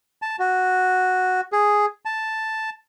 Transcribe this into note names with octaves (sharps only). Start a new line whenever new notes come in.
A5
F#4
G#4
A5